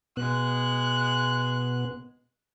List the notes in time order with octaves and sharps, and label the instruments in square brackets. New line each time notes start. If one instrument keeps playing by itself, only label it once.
[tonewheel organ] B2 B3 [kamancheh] G#3 F#6